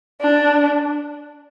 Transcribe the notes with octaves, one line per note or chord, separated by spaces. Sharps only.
D4